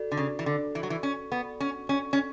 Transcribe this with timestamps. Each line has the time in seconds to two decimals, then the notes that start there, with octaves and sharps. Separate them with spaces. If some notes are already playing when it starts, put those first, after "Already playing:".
Already playing: F#4 A4 D5
0.12 D3
0.17 C#3
0.39 E3
0.46 D3
0.75 E3
0.83 F#3
0.90 E3
1.03 C#4
1.32 B3
1.60 C#4
1.89 C#4
2.13 C#4